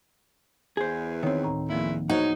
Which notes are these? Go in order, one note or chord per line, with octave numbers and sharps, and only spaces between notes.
E2 G#4 C5
D#3 C4 C#5
D2 A2 A#5
E2 A#2 F3 A#3 E4
E2 F#3 D#4 F#4 C5 F#5